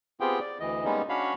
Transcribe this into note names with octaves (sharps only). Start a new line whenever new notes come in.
B3 C4 F4 G4 G#4 G5
D5
D2 E3 D#5
G3 G#3 A#3 B3 C#4 D#4
C#4 D4 F#4 C#5 F5 B5